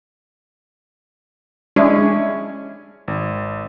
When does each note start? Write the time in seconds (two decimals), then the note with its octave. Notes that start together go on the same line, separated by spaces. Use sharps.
1.76 G#3 C#4 D4 E4
3.08 G#1